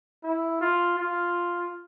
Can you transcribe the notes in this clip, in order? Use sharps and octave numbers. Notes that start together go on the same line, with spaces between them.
E4
F4
F4